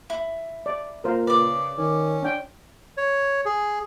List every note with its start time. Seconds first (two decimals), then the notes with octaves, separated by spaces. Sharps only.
0.10 E4
0.66 D5
1.04 A#2 A#4 C5 F5
1.27 C#3 B4 D5 D6
1.78 D#3 C#4
2.23 D4 G5
2.97 C#5
3.45 G#4